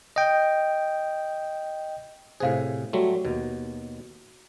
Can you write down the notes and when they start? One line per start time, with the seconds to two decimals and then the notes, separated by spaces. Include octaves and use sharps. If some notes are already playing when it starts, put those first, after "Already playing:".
0.16 D#5 G5
2.40 A2 C3 G#4 C5 F5
2.93 F#3 G3 A3 F#4
3.25 D#2 B2